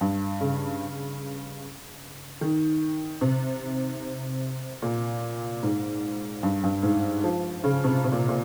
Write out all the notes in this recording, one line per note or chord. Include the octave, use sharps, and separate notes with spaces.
G2
C#3
D#3
C3
A#2
G#2
G2
G2
G#2
F3
C#3
C3
C3
A#2
A#2